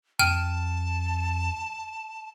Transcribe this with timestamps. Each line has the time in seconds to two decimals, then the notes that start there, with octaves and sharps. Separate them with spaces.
0.19 F2 G5 A5 F6 D#7